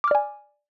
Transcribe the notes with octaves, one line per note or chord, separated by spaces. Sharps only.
D5 G#5 D6 F6